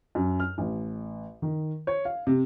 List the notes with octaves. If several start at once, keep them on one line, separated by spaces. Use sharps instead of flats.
F#2
F6
A1
D#3
C#5
F5
C3